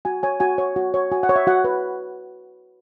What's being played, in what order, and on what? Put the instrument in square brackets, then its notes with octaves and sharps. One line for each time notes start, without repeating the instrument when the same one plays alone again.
[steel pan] F#4 G#5
C#5 G#5
F#4 G#5
C#5
F#4
C#5
F#4 G#5
F#5
C#5
E5
F#4 F#5
B4